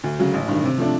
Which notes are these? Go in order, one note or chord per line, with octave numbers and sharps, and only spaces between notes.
D2
C#3 F#3
A1
G2 D#3
C3
F3 A3 D4